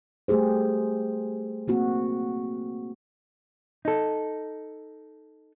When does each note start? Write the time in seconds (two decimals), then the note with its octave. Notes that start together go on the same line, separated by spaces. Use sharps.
0.28 G3 A3 G4 G#4 C5
1.68 A#3 C4 F#4
3.85 D#4 A4